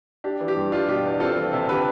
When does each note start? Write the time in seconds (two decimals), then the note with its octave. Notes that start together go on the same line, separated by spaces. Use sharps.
0.24 D4 G4
0.40 E3
0.48 G4
0.56 G2
0.72 D4 F4
0.88 B2 G4
1.05 E2
1.20 C4 F4 A4
1.37 E3
1.53 C3
1.69 D3 G4 B4